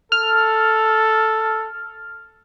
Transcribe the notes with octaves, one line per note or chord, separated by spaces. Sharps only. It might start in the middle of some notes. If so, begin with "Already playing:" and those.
A4 F6